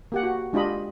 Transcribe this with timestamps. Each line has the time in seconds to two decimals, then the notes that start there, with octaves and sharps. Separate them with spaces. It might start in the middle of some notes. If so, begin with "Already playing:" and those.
0.12 A#3 G4 F#5
0.23 F#4
0.53 G#3 D4 F4 G4 D#5 B5